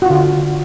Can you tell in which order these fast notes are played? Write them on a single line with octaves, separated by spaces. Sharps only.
F#4 F4 D3